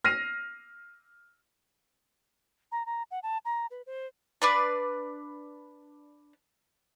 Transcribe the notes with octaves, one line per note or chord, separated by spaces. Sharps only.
F6 A#6 C7 D#7
A#5
A#5
F#5
A5
A#5
B4
C5
D4 B4 D5